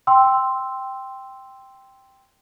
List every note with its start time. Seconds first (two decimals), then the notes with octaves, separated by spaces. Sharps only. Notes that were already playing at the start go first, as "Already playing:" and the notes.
0.07 G5 C6 E6